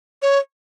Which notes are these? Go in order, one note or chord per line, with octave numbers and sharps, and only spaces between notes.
C#5